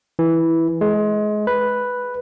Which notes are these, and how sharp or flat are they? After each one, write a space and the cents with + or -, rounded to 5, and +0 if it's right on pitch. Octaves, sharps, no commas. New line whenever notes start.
E3 -5
G#3 +25
B4 +0